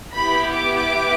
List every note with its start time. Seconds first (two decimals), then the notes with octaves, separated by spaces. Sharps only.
0.13 B3 E4 G4 B5
0.54 D6